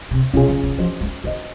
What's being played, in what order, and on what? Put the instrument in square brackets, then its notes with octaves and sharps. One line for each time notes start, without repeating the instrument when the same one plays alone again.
[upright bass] C3
[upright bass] C3 [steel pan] C#4 F4 G#4
[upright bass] C#3
C#3
[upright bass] F3 [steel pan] F#4 C5 D#5
[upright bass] G#3
[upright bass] D#3 [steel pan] F#4 C5 D#5